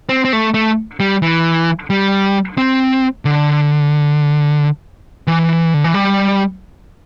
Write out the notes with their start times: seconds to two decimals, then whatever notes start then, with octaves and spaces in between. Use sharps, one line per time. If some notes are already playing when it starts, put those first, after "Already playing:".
0.09 C4
0.25 C4
0.33 A3
0.54 A3
1.00 G3
1.22 E3
1.90 G3
2.58 C4
3.25 D3
5.27 E3
5.74 D3
5.84 E3
5.94 G3